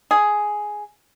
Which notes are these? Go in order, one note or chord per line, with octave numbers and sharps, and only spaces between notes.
G#4